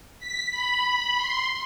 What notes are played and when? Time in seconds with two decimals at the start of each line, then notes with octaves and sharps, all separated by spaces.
0.19 B6
0.51 B5
1.17 C6